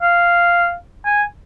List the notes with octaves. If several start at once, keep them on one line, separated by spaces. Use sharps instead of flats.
F5
G#5